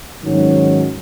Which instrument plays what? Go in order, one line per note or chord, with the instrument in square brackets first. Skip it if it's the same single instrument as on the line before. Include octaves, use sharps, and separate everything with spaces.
[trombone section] G#2 D#3 F#3 C#4